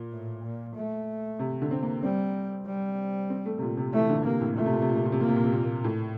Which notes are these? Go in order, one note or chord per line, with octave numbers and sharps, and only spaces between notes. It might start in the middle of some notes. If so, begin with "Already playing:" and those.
Already playing: A#2
A2
A#2
A3
C3
D3
C4
A#3
G3 C4
G3
C4
A3
C3
A#2
C3
E3 A3
D3
C3 A#3
A2
A#2 A3
C3
A#2
C3
A#2
C3
A#2
C3
A#2 A#3
C3
A#2
C3
A#2
A2